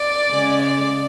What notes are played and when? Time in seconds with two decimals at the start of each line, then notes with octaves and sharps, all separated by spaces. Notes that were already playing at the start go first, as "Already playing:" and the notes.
Already playing: D5
0.30 C#3 G#3
0.62 D5